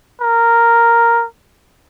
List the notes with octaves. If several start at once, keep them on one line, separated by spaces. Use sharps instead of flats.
A#4